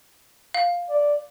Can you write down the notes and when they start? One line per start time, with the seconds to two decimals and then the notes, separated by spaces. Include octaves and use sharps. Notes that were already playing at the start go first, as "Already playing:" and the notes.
0.54 F5
0.90 D5